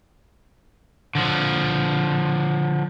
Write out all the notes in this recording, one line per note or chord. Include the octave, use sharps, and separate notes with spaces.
D3 F3